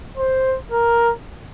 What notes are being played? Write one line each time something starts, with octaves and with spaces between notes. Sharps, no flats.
C5
A#4